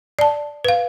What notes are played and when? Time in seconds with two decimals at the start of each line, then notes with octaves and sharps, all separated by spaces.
0.19 D5 A5
0.65 B4 F5